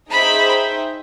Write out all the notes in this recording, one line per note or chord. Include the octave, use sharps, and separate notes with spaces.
D#4 G#4 C5 E5 G5 B5